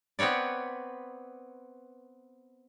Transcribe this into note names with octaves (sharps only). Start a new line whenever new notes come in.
B3 C4 B4 C#5 D5